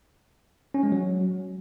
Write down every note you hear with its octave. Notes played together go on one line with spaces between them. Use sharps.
C#4
G#3
F#3